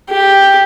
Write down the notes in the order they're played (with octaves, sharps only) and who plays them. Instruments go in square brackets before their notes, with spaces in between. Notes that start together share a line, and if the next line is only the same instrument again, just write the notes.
[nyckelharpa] G4